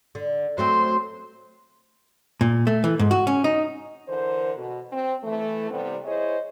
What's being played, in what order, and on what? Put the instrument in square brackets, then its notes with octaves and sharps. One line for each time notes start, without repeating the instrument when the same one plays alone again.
[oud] D3
[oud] F#3 A3 C4 [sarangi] C5
[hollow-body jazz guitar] A#2
A3
E3
G#2
F#4
C#4
D#4
[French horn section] D3 E3 A#4 C5
B2
C4
E3 A3
C3 E3 G3 B3 C4
E4 G#4 C5 C#5 D#5